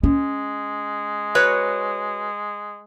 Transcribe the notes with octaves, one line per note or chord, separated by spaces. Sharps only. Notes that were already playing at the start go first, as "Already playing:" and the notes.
G#3 C#4
F#4 B4 C#5